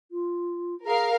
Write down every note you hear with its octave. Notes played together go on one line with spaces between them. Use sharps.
F4
G#4 A#4 F5